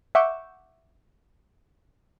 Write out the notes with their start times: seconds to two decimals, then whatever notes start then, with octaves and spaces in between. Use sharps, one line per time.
0.15 E5 F#5 C#6 D6 G6 E7